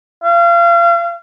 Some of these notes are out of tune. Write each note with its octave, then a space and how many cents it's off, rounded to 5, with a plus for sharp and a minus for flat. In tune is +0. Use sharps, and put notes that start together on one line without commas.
F5 -35